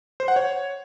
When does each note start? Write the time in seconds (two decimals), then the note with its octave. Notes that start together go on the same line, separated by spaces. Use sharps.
0.20 C5
0.28 F#5
0.36 C#5